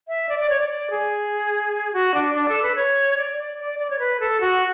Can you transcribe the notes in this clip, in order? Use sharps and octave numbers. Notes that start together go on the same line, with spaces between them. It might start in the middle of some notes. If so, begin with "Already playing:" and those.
E5
D5
D5
C#5
D5
D5
G#4
F#4
D4
D4
A4
B4
C#5
D5
D5
D5
D5
C#5
B4
A4
F#4